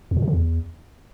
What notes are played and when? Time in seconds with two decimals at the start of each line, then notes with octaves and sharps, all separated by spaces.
0.11 E2
0.17 A#2
0.22 C3
0.28 D3
0.33 E2